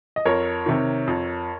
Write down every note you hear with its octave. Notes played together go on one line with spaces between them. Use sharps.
D#5
F2 A#4 C#5
C3 D#3
F2